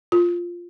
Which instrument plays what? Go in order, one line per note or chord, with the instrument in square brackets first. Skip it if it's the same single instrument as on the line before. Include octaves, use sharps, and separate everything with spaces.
[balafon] F4